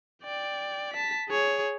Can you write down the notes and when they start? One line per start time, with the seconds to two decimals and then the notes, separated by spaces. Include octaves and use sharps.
0.24 D5 G5
0.94 A5 B6
1.29 G#4 C#5